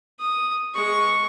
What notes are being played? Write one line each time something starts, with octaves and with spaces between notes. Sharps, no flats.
D#6
G#3 C#6